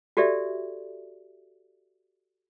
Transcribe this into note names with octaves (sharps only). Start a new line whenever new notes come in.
F#4 G4 A4 D5 E5